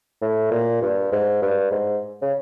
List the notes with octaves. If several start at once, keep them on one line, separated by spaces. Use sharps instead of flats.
A2
A#2
G2
G#2
G2
G#2
C#3